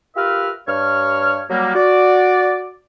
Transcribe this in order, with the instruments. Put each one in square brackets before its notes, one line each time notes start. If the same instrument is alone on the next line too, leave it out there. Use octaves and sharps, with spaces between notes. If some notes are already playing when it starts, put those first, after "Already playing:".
[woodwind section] F4 G4 A#4 B4 E5 F6
G2 C#5 F6
F#3 G3 A#3
F#4 D5